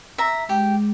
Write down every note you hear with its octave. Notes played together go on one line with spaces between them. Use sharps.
E5 A#5
G#3 G4